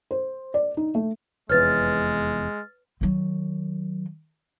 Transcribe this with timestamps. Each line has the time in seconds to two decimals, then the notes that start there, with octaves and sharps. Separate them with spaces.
0.11 C5
0.54 D5
0.77 D#4
0.95 A3
1.49 F1 E2 G#3 B4 C#5 F6 A6
3.01 D#3 F#3